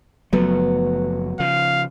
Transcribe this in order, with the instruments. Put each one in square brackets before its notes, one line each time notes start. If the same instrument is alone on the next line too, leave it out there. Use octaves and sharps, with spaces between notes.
[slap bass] F#1 F3 A3 [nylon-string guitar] F#3 B3
[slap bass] C#3 F3 [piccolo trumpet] F5